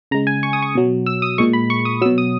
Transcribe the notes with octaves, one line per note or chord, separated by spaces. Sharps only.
C#3 G#3 A#5
G#5
C#6
D#6
C#6
B2 F#3
E6
D#6
A#2 G#3 C#6
B5
C#6
D#6
B2 F#3 E6
D#6